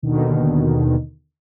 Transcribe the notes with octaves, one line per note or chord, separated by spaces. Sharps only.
D#2 B2 D3 D#3